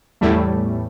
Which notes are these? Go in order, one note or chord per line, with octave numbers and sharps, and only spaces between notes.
E2 A2 E3 G3 A3